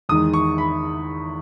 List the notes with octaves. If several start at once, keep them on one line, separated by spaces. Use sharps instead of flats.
E2 D#3 G#3 D#6
C#6
B5